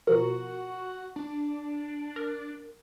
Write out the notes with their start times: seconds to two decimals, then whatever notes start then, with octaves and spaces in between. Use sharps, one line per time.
0.07 B2 F3 F#4 A#4
1.16 D4
2.16 A#4